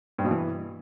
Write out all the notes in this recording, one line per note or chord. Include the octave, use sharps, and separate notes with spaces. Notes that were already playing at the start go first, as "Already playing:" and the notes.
G2
B2
E3